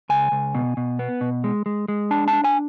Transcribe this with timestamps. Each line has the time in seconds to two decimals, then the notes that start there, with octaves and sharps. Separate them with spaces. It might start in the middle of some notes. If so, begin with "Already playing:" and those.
0.09 C#2 G#5
0.32 C#2
0.55 B2
0.77 B2
0.99 B3
1.21 B2
1.44 G#3
1.66 G#3
1.88 G#3
2.11 D4 A5
2.28 A5
2.33 D4
2.44 G#5